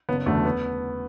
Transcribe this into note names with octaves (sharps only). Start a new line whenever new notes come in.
F#1 B3
E2 D3 F#3 A3
B3